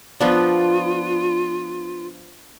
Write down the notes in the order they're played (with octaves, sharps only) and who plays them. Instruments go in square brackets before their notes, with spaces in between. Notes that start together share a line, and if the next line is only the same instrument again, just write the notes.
[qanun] F3 B3 D4 [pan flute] F4